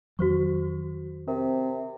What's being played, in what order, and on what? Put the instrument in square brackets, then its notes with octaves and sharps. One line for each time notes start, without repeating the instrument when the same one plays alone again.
[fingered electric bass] F2 D#3 F#3 [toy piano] F#4 C5 C#6
[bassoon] C3 [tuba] C4 [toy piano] A#4